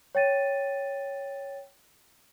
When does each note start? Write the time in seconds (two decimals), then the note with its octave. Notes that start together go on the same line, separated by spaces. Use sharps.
0.15 C#5 G5 A6 D#7